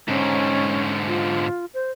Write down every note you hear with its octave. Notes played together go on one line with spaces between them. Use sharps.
G#2 D3 C#4
F4
C5